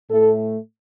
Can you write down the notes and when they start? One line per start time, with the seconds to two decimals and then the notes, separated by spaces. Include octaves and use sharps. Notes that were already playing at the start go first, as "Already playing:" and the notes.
0.11 A2 A3 A4